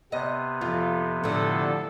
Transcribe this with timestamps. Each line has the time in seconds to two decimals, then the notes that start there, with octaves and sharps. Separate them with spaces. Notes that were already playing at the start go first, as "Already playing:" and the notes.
0.12 C3 B3 D#5
0.61 F2 F4
1.24 A2 D3 F3 A4